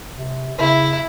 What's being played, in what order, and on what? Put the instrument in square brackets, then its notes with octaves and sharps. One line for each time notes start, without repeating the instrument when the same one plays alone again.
[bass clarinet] C3
[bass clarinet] C#3 [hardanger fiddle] E4